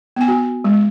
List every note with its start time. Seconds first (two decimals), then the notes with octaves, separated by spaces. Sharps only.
0.16 B3 G#5
0.28 F#4
0.64 G#3